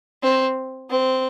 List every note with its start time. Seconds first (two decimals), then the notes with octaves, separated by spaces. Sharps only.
0.23 C4
0.90 C4